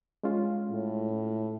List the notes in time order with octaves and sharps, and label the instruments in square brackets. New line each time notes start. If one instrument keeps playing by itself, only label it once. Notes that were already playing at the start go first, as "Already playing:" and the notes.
[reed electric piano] G#3 C#4 F4
[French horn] A2